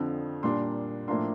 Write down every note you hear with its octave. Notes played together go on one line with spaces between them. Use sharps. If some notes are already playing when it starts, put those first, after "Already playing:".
Already playing: F2 D3 F3 C4
A#2 G3 A#3 D4 C6
A2 F3 A#3 D4 C6